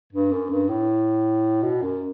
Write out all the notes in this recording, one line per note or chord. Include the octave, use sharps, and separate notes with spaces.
G2
F#2
G2
A2
B2
F#2